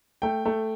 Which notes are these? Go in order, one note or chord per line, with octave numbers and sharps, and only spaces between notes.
A3 G5
A3